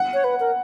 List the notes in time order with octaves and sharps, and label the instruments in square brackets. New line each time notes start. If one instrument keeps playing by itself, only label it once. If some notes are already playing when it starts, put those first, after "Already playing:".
Already playing: [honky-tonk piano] F#5
[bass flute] C#5
B4
A#4